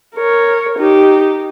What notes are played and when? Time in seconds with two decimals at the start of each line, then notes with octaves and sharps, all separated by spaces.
0.16 A#4 C#5
0.79 D#4 G4